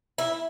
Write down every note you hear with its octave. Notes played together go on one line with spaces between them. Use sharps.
E4